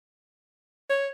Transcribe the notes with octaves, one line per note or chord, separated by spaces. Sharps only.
C#5